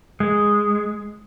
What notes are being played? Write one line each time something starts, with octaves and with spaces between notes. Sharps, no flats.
G#3